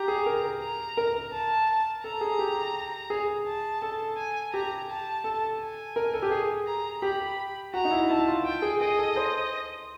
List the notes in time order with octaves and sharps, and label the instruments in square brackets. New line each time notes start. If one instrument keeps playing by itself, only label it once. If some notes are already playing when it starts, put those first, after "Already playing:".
Already playing: [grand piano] G4 [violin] A#5
[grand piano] G#4
A#4
[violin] A#5
[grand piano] A#4
[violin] A5
[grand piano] A4 [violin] A#5
[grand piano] G#4
G4
G#4
[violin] A5
[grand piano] A4
[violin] G#5
[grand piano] G4 [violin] A#5
[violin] A5
[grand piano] A4
[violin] G#5
[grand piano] A#4
A4
G4
G#4
[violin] A#5
[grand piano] G4 [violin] B5
[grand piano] F#4 [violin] A#5
[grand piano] D#4
E4
[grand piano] E4 [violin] A5
[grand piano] F4
[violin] G5
[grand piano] G#4
[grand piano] G#4 [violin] D#5
[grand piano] A4
C5